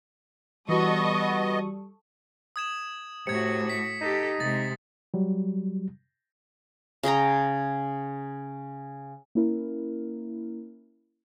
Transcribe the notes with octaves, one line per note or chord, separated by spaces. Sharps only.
E3 G3 B3 F#4 A4 D#5 C#6 D#6
D#6 G#6 E7
A2 C3 F#4 G#6 C#7
B6
D#4 G4 A4
C3 G#3 A6
F#3 G3
C#3 G#4 G5 A#5
A#3 C#4 E4 A#4